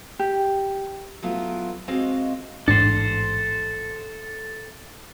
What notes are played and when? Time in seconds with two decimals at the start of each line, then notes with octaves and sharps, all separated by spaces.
0.19 G4
1.23 F#3 A3 B3 E4 F4
1.88 G#3 C4 F#4 D#5 F5
2.68 A1 G#2 D4 A4 C5